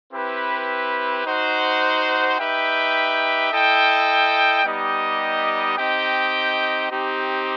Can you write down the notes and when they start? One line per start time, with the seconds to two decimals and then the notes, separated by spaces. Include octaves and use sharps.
0.12 C4 E4 G4 B4
1.25 D#4 F#4 C5 F#5
2.38 D#4 G4 B4 E5 G5
3.52 E4 A4 D#5 G5
4.65 G3 B3 D#4 G4 D#5
5.78 C4 D#4 G4 D#5 G5
6.91 C4 D#4 G4